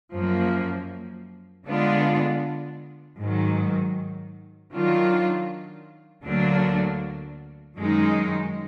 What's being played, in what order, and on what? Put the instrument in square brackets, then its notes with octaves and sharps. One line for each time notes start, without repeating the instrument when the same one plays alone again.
[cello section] F#2 F3 A#3
D3 G#3 B3 D4 F4
G#2 D#3 F#3
D#3 F#3 D4 F4
D2 D3 F#3 A#3 D4
F#2 D#3 G#3 D#4